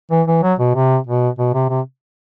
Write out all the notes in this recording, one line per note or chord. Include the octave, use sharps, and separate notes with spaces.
E3
E3
F#3
B2
C3
B2
B2
C3
C3